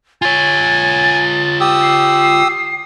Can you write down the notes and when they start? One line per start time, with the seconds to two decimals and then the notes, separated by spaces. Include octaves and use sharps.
0.22 F4 C#5 G#5 A6
1.61 G4 D#6 E6
1.82 C7